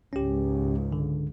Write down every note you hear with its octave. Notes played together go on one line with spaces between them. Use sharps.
C#2 G#2 C#4 G4
D3